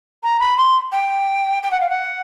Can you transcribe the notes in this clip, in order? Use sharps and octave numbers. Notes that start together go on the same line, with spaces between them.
A#5
B5
C6
G5
G5
F#5
F5
F#5